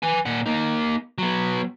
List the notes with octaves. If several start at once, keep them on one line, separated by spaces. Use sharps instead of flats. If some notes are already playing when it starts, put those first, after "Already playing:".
B4 G#5
A#2 F#5
A#3 D#4
F#3 B3